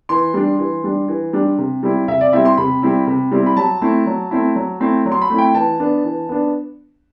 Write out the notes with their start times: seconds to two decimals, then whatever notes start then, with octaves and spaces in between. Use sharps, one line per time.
0.09 E3 C6
0.34 G3 D4
0.59 E3
0.84 G3 D4
1.08 E3
1.33 G3 D4
1.58 C3
1.83 G3 C4 E4
2.08 C3 E5
2.21 D5
2.33 G3 C4 E4 E5
2.45 C6
2.57 C3 B5
2.82 G3 C4 E4
3.07 C3
3.32 G3 C4 E4
3.46 B5
3.56 F#3 A5
3.82 A3 C4 E4
4.06 F#3
4.31 A3 C4 E4
4.56 F#3
4.80 A3 C4 E4
5.06 F#3
5.12 C6
5.22 B5
5.30 A3 C4 E4
5.38 G5
5.55 E3 A5
5.80 B3 D4
6.04 E3
6.29 B3 D4